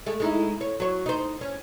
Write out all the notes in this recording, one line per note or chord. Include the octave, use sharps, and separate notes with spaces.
G#3 A3
G#3 D#4 E4
C#5
F#3 C#5
D#4 C5
C#4